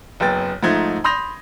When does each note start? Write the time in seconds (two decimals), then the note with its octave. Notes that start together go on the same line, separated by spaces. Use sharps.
0.20 F#1 F#2 B3 G5 A6
0.63 G#2 F3 A3 D#4 G#6
1.04 B5 C6 D#6 G6 A#6 F7